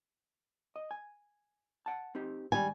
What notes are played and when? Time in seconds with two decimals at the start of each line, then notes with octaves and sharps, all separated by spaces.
0.76 D#5
0.91 G#5
1.86 F#5 A5
2.15 C4 D#4 G4
2.52 G#2 D#3 G3 G#5